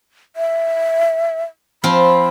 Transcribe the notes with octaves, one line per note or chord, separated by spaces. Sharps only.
E5
F3 C4 F4 B5